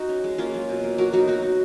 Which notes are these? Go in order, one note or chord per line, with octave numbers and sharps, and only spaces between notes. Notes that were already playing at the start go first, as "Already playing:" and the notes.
Already playing: D#4 F#4
C#4
G#3
A#3 C#4 F4
F#3
B2
A#3
F#3 F#4 A#4
F#3 D#4 F#4
B2 D#4 F#4
B2 D#4